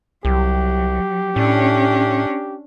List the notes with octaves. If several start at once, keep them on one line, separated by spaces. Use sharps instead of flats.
C2 F#3 G4
A2 C#4 D4